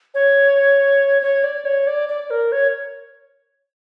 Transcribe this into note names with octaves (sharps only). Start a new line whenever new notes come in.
C#5
C#5
D5
C#5
D5
D5
A#4
C#5